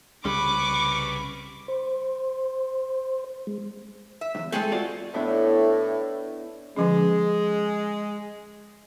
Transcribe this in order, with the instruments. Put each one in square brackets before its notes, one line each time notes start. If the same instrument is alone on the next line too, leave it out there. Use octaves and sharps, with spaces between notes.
[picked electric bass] C2 C#3 G3 [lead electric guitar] C#4 B4 [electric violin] C#6 D6
[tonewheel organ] C5
G#3
[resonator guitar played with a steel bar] E5
[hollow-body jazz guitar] B1 E2
[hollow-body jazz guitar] G#3 A3 [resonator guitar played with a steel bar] C4 G#4 A4
[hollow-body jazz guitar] F4 F#4 D5
[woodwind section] A2 [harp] B3 D4 E4
[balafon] D3 F3 C#4 [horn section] G#3